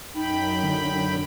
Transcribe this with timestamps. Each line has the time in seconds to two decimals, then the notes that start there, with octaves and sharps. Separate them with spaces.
0.15 F#2 D#4 G5 B5
0.63 D3